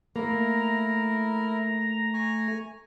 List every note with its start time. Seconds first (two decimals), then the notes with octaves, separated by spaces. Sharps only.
0.16 A3 A#3 E4 A#4 A#5
2.14 G#5 C#6